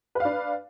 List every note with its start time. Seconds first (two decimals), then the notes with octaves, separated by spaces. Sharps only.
0.15 B4
0.20 F5
0.25 D4